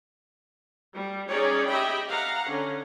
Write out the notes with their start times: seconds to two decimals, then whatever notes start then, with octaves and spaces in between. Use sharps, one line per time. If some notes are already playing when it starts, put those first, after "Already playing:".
0.95 G3
1.29 C#4 D#4 G#4 C#5 D5
1.67 G4 D#5 E5 G5 B5
2.09 F5 F#5 A#5
2.47 D3 C#4